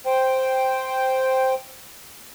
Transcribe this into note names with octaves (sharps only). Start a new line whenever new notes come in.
C5 G5